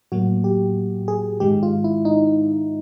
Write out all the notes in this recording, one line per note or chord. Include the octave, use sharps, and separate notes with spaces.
A2 F#3 A#3 F#4
G4
G#4
G#2 D#3 G#3 G4
F4
E4
D#4